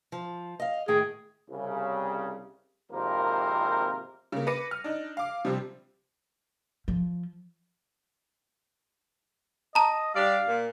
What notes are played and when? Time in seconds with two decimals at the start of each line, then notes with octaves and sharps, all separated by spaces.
0.12 F3
0.60 D#5 F5
0.88 A2 D#3 G#4 G5
1.50 C2 C#3
2.91 G#1 F2 C3 A#3 A#4 C5
4.32 C#3 A#3
4.47 B4 D6 A#6 C#7 D#7
4.71 F6
4.84 D4 D#4
5.17 F5 D6
5.45 C3 F3 G3 C4
6.88 F3
9.75 D#5 A5 A#5
10.15 G3 D4 D5 F5
10.48 A#2